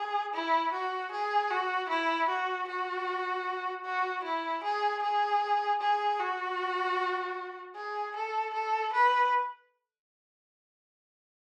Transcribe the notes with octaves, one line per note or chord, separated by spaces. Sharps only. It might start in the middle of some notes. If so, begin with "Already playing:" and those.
Already playing: G#4
E4
F#4
G#4
F#4
E4
F#4
F#4
F#4
E4
G#4
G#4
G#4
F#4
G#4
A4
A4
B4